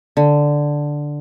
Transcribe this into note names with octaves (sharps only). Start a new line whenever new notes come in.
D3